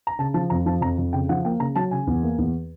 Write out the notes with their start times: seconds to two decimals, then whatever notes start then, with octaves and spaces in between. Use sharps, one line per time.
0.07 A#5
0.19 C#3 A5
0.34 F3 A5
0.50 F2 A#5
0.66 F3 A5
0.81 F2 A#5
0.98 F2
1.13 C#3 G5
1.29 F3 F#5
1.45 A#3 G5
1.60 C#3 A#5
1.76 F#3 A5
1.91 C#3 G#5
2.07 E2
2.23 A#3
2.38 E2